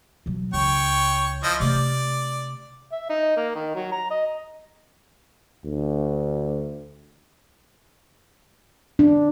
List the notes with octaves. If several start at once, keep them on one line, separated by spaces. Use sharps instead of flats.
B2 F#3
C#2 C#5 G5 C#6
F3 E4 D#5
C3 A3 D5
E5
D#4
A#3
D#3
F#3
A#5
D#5
D2
D4